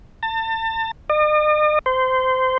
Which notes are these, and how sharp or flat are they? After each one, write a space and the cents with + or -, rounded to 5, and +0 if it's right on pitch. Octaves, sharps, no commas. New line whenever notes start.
A5 +35
D#5 -45
C5 -20